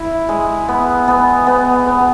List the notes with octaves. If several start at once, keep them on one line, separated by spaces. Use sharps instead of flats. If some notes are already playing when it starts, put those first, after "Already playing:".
Already playing: E4
G#3
B3
B3
B3
B3